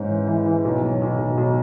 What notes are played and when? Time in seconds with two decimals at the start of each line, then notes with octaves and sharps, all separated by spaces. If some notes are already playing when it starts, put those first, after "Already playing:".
Already playing: G#2 G#3 C#4
0.09 E3
0.27 E3
0.46 E3
0.65 B1
0.82 F#3
1.02 B1
1.19 B1
1.37 B1